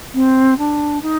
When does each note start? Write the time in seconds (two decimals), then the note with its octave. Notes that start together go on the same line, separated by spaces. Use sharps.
0.14 C4
0.58 D4
1.02 D#4